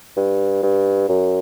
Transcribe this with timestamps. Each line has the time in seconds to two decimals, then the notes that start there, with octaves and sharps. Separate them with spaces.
0.17 G2
0.63 G2
1.09 F#2